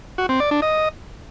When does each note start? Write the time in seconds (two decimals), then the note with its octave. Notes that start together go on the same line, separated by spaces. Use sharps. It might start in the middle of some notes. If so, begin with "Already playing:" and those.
0.18 F#4
0.29 C4
0.40 D5
0.51 D4
0.62 D#5